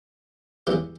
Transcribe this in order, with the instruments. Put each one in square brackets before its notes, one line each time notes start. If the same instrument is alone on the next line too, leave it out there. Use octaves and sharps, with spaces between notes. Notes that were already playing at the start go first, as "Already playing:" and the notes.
[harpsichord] E2 E3 G4